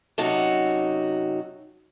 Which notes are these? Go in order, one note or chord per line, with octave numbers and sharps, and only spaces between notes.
F#2 C3 D#4 F#4 C#5 A5